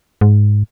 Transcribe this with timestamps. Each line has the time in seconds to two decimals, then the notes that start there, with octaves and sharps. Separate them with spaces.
0.21 G#2